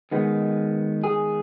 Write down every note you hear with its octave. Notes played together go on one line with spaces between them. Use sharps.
D#3 G#3 B3
G#4